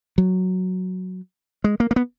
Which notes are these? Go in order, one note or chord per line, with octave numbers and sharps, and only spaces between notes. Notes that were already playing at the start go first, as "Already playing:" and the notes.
F#3
G#3
A#3
A#3
B3